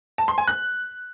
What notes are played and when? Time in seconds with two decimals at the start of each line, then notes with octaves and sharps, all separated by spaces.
0.18 A5
0.28 C6
0.38 G#5
0.48 F#6